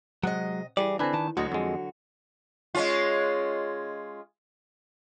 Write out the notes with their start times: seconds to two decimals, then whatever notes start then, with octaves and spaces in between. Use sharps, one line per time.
0.23 C3 F#3 G#3 D#5 F#5
0.77 E3 G3 G#4 A4 D5
0.99 D3 C4 D4 B4 G#5
1.14 D#3 A5
1.37 D2 D3 F#3 F#4 D#5
1.52 F2 G#3
2.75 G#3 C#4 F4